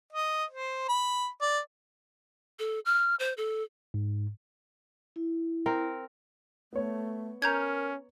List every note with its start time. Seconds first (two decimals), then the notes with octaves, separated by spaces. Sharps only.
0.13 D#5
0.50 C5
0.88 B5
1.41 D5
2.59 A4
2.86 F6
3.20 C5
3.37 A4
3.94 G#2
5.16 E4
5.66 C4 A#4
6.73 A3 B3 C#5
7.42 C#4 A#4 A#5 G6 G#6